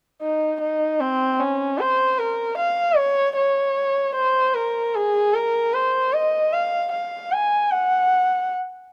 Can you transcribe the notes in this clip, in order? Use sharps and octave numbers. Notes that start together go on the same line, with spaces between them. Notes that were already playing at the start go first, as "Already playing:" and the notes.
D#4
D#4
C4
C#4
C5
A#4
F5
C#5
C#5
C5
A#4
G#4
A#4
C5
D#5
F5
F5
G#5
F#5